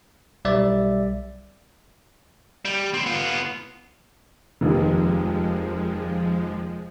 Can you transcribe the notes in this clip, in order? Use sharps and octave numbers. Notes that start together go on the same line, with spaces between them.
B1 G3 D5 E5 A6
G3
B3 C4
B3 F4
F1 D#2 F3 G#3